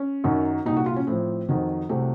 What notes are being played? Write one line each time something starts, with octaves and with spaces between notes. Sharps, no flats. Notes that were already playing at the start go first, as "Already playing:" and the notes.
Already playing: C#4
F#2 D#3 F#3
C2 A#2 F#3 D#4
F#4
F4
C#4
A2 F3 C4
F2 D#3 F#3
C2 C3 F#3 A3